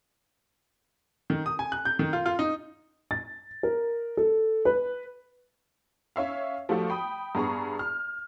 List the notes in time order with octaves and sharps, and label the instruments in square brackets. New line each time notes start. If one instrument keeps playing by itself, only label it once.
[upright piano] D#3
D#6
G#5
F#6
G6
D#3
F4
F4
D#4
A6
A#4
A4
B4
[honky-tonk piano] C#4 C#5 E5 F5
F3 G3 A3 F#4 G4 A4
G5 B5 D#6
G2 B3 G#4 A#5 C#6
F6